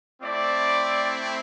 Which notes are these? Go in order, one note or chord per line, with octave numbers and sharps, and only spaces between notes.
A3 C4 E4 D5